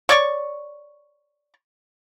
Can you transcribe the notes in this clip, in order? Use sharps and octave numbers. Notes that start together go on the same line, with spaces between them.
C#5 D5 C#6